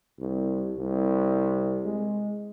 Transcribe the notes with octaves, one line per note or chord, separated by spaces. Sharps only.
C2
C2
G#3